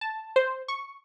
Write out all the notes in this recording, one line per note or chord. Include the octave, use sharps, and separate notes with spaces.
A5
C5
C#6